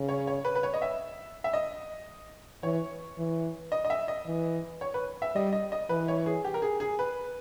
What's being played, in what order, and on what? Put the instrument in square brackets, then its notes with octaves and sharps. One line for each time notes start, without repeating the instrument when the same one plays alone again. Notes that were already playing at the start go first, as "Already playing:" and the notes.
Already playing: [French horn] C#3
[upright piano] C#5
C#5
B4
B4
C#5
D#5
E5
E5
D#5
[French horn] E3 [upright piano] C#5
[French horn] E3
[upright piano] D#5
D#5
E5
D#5
[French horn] E3
[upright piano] C#5
B4
E5
[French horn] G3 [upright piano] D#5
[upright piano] D#5
D#5
[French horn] E3 [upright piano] B4
[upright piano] C#5
G#4
G4
A#4
G#4
G#4
B4